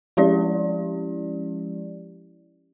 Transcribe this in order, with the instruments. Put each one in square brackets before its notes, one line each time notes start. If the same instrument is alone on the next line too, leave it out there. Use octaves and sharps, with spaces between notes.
[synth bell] F3 G#3 C#4 E4 G4 D5